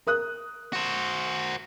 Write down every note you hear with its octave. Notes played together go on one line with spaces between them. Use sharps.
A#4 D#6 F#6
F#4 C5